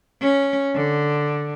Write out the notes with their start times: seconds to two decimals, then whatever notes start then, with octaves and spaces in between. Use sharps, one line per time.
0.22 C#4
0.76 D3